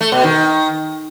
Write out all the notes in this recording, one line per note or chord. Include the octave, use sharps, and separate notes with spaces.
A3
B2
D#3